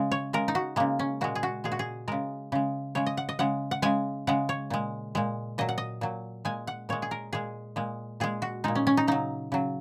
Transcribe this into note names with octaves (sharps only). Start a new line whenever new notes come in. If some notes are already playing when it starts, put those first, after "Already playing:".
Already playing: C#3 G#3
C#5
C#3 G#3 A#4
D#4
F#4
C#3 G#3 A#3
C#4
A#2 G#3 F#4
G#4
F#4
A#2 G#3 G#4
F#4
G#4
C#3 G#3 A#4
C#3 G#3
C#3 G#3 C#5
D#5
F#5
D#5
C#3 G#3 F#5
F#5
C#3 G#3 G#5
C#3 G#3 F#5
C#5
A#2 G#3
A#2 G#3
A#2 F#3 D#5
F#5
D#5
A#2 F#3
A#2 G#3 G#5
F#5
A#2 G#3 C#5
G#4
A#4
A#2 G#3 G#4
A#2 G#3
A#2 G#3 G#4
F#4
A#2 G#3 D#4
C#4
C#4
D#4
C#3 F#3 D#4
C#3 F#3